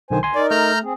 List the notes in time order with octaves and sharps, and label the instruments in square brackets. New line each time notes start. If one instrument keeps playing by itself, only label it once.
[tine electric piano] B1 D3 D#3 [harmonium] C5 G#5
[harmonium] D2 [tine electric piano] G#5 C6
[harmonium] D#4 A#4 [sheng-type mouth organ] D5
[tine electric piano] A3 [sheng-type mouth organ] A#5 F6 G6
[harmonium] C4 G#4